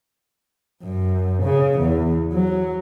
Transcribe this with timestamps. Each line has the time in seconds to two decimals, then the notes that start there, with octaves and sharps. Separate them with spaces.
0.83 F#2
1.43 C#3
1.79 E2
2.32 F#3